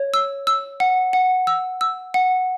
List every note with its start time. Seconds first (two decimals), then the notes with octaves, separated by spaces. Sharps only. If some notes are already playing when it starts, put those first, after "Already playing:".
Already playing: C#5
0.14 E6
0.47 E6
0.80 F#5
1.13 F#5
1.47 E6
1.81 E6
2.14 F#5